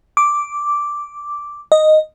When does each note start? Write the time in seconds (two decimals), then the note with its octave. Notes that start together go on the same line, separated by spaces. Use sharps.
0.17 D6
1.72 D#5